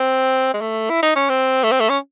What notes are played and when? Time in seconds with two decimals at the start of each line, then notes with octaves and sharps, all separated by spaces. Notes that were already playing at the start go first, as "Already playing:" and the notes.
Already playing: C4
0.54 G#3
0.61 A3
0.90 E4
1.03 D#4
1.16 C#4
1.30 C4
1.64 A3
1.71 C4
1.80 A3
1.89 C#4